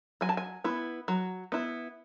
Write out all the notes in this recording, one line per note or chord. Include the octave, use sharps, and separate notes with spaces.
F#3 G#5
A5
G#5
B3 E4
F#3
B3 E4